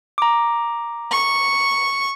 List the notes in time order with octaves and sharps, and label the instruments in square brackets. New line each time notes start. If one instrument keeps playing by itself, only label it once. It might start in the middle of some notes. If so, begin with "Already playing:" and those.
[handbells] A#5 D6
[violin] C#6